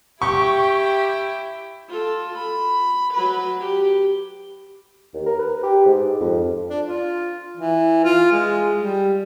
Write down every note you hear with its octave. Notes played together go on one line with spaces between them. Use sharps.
E4 G4 G5 C#6
F4 A4
B5
F#3 B4
G4
D#2
A#4
B4
G4
G#2
F2
D4
F4
E3
F4
G#3
G3